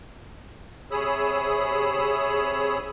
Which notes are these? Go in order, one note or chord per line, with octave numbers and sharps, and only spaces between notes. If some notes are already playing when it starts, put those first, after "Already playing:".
C3 G#4 C#5 B5 D#6 E6